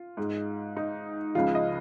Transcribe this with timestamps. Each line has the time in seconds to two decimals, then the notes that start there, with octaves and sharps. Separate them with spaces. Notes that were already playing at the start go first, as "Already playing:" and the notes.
Already playing: F4
0.17 G#2 G#3
0.77 D#4
1.35 C#2 C#3 F3 F4
1.55 D#5